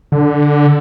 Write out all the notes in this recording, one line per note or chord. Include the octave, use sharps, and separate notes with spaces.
D3